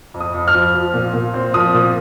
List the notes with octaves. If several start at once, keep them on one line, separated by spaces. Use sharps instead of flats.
F2
D#6
F2
F6
F3
F3
A#2
A#2
C4
F3 D#6
A#2